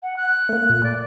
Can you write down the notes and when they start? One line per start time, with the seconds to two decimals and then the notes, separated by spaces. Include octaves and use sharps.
0.03 F#5
0.16 F#6
0.49 A3 A#3
0.69 A#2
0.83 D5